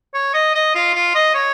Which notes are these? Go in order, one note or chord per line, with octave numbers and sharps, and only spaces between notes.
C#5
D#5
D#5
F4
F4
D#5
C#5